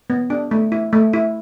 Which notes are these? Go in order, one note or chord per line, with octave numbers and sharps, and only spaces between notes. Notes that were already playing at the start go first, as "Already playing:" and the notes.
B3
D4
A3
E4
A3
E4